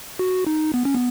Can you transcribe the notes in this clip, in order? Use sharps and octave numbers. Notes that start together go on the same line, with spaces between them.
F#4
D#4
B3
C#4
B3